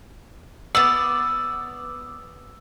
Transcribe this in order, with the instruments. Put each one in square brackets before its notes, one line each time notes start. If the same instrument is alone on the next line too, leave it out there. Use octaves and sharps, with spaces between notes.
[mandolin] B3 D5 [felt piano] E6